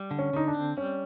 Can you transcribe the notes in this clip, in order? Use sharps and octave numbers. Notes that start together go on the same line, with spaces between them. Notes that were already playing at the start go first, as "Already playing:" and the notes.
Already playing: G3
D3
C#4
D3 D#4
D4
C4
G3 C#4